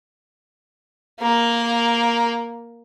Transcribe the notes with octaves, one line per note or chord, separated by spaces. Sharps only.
A#3 A#4